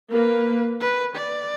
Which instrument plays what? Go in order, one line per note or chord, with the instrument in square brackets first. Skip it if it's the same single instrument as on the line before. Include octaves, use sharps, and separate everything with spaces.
[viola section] A#3 [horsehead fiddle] B4
[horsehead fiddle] B4
D5